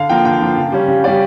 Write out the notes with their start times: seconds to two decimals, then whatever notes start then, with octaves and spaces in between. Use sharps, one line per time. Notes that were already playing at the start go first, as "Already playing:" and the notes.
Already playing: D3 F5
0.09 F3 A#3 G5
0.25 D3 G5
0.41 F3 A#3
0.57 C#3
0.72 G3 C#4
0.88 C#3
1.04 G3 C#4 D5